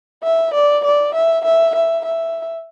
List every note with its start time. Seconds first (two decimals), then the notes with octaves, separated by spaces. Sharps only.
0.24 E5
0.54 D5
0.84 D5
1.14 E5
1.45 E5
1.76 E5
2.06 E5